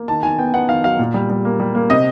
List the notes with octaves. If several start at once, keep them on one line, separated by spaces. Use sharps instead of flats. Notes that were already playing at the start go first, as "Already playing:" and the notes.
Already playing: A#3
D#3 A5
D#3 G#5
B3 G5
B3 F#5
D#3 F5
F#3 F5
A#2
G3
G3
A#3
G3
A#3
C3 D#5